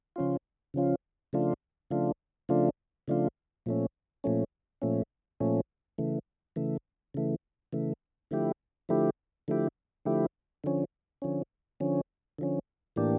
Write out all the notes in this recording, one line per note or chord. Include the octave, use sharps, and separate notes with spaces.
C#3 F3 C#4 F4
C#3 F3 C#4 F4
C#3 F3 A3 D4 F4
C#3 F3 A3 D4 F4
C#3 F3 A3 D4 F4
C#3 F3 A3 D4 F4
A#2 F3 A3 C#4
A#2 F3 A3 C#4
A#2 F3 A3 C#4
A#2 F3 A3 C#4
C#3 E3 A3
C#3 E3 A3
C#3 E3 A3
C#3 E3 A3
D3 F3 A3 E4 G4
D3 F3 A3 E4 G4
D3 F3 A3 E4 G4
D3 F3 A3 E4 G4
D3 F3 C#4
D3 F3 C#4
D3 F3 C#4
D3 F3 C#4
A2 E3 A#3 D4 G4